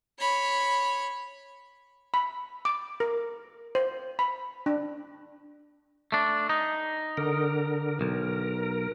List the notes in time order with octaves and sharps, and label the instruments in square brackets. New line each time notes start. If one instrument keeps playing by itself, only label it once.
[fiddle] C#5 B5
[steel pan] B5
D6
A#4
C5
B5
D4
[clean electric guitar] A3 D4
D#4
[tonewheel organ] D3 A#4
[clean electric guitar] B1 [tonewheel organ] A#4